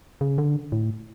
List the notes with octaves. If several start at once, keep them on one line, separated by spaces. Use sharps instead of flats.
C#3
D3
A2